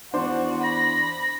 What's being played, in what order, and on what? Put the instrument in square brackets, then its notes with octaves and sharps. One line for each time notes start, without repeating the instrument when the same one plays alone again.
[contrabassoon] E2 [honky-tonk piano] D4 C5 [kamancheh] F#4
[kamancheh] B5 [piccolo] A#6